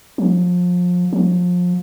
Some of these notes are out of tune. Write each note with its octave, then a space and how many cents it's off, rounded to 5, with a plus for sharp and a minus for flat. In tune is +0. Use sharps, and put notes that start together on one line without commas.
F3 +30
F3 +30